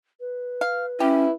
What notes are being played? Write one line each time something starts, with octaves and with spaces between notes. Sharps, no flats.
B4
F5
C#4 E4 G4